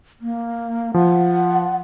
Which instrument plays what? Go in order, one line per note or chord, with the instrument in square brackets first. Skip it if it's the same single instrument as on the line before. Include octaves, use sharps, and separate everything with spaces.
[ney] A#3
[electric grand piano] F3 [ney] F#5